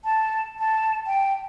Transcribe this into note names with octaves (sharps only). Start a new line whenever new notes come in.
A5
A5
G5